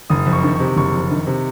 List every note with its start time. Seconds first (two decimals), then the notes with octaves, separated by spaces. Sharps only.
0.10 F#1 D#6
0.27 F2
0.33 C#6
0.44 D#3
0.55 C3 C#6
0.76 F#1 C#6
0.94 F2
1.11 D#3
1.27 C3